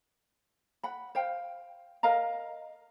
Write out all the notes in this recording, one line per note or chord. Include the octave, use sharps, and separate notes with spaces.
F#5 B5
C5 F5 G5
A#4 D#5 F5 A#5